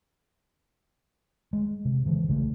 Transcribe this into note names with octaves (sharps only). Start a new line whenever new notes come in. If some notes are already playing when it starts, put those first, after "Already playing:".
G#3
C3
C#3 E3 G#3
B1 C#3 F3 A3